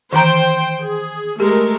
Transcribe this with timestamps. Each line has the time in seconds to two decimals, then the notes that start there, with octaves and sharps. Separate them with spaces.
0.13 D#3 E3 C5 G5 A#5
0.82 G#4
1.40 G#3 A3 G4 A#4